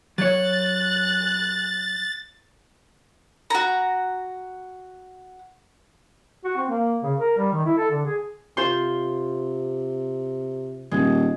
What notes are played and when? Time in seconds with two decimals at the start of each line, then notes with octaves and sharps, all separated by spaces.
0.18 F#3 C#5 F#6 A6
3.50 F#4 A#5
6.45 F#4
6.57 C4
6.69 A#3
7.03 C#3
7.18 A#4
7.38 G3
7.52 D#3
7.65 E4
7.77 A4
7.91 D3
8.05 G#4
8.57 C3 F4 C5 C6
10.91 D#1 G#3